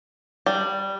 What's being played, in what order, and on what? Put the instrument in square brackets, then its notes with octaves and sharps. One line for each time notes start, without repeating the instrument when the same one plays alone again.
[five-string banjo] G3